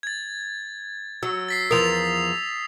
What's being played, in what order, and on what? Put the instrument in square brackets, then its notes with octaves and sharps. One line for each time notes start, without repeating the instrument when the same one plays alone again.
[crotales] G#6 A6
[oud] F#3 [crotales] E6
[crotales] A6 B6 C7
[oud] E2 F3 A#4 [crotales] D#6 F7